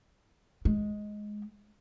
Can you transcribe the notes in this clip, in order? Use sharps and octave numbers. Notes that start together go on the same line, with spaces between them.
G#3